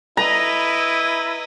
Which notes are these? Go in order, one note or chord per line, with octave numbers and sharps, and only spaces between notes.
E4 B4 D#5 A#5